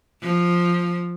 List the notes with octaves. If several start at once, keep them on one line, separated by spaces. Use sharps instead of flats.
F3